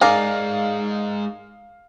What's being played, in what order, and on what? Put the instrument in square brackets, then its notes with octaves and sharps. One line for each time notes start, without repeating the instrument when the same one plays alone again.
[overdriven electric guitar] G#3 D#4 [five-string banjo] G#4 A#4 D5 [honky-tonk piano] F5